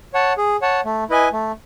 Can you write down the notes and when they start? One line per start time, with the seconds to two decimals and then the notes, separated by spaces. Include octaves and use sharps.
0.14 C#5 F#5 A5
0.37 G#4
0.61 C#5 F#5 A5
0.85 A3
1.10 E4 B4 D#5 G#5
1.33 A3